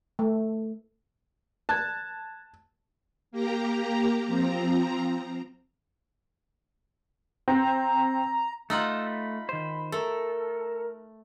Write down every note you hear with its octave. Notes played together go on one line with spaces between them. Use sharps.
A3
A5 F#6 G#6
A#3 G4 A#5
F3 C4 A#5
C4 A#5
A3 D#4 F4 F#5 E6
B5
D#3 C5
A3 A4 A#4